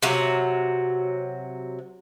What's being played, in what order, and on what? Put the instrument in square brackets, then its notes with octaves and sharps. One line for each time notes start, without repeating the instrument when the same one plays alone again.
[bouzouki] C3 F#3